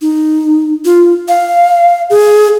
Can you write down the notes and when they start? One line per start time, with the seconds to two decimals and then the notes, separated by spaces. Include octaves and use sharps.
0.01 D#4
0.85 F4
1.28 F5
2.10 G#4